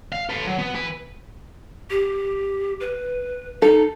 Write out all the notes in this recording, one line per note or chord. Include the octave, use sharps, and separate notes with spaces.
F5
A4 B4
F#3
B3
E4 B4
G4
B4
D#4 A4